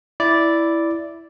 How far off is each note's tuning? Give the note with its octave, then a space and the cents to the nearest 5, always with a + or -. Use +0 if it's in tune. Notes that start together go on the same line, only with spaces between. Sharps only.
E4 +0 D5 -5